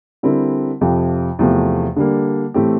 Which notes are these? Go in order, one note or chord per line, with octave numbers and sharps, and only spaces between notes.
D3 G3 C4 E4 A#4
F2 C3 F3
E2 C3 F3 A3
D3 G3 A#3
A2 E3 A3 C4 G4